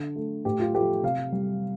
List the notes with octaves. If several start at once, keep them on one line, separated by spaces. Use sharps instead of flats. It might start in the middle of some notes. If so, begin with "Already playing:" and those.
Already playing: D3
A3
A2 G4
F4
F3 A3 G4
C3 F5
G3